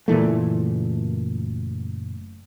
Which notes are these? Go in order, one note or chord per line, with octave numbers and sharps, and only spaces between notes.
F#1 A#2 E3 A3